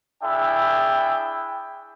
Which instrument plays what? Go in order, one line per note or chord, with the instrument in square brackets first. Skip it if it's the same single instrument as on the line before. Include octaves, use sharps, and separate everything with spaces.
[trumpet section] D4 E4 G#4 E5 G5